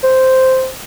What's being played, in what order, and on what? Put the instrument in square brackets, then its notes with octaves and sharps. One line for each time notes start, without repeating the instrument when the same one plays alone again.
[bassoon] C5